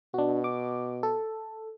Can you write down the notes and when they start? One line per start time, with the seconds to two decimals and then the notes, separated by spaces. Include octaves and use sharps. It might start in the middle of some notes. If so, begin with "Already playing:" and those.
0.14 B2 D4 F#4
0.44 D6
1.03 A4